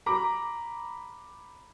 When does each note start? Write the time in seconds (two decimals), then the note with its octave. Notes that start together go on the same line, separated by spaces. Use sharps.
0.06 A#5 B5 D6